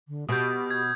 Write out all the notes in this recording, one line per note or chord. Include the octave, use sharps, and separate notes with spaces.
D3
B2 G4 D#6 G6
G#6